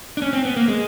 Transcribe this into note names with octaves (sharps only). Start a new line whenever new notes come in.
D4
C#4
C4
B3
A#3
G#3